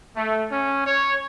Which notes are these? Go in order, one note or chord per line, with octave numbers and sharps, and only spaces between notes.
A3
C#4
C#5